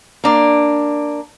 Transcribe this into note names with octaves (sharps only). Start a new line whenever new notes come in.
A#3 D4